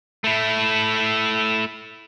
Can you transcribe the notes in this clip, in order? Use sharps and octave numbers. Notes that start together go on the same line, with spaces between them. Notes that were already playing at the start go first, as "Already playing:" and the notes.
A3 E4